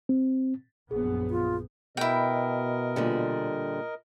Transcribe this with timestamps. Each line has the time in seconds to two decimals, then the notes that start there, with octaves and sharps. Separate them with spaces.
0.09 C4
0.91 A#1 F#2 B3 G#4
1.30 F4
1.97 B2 E4 A#4 D#5 G5
2.96 A#2 D3 G3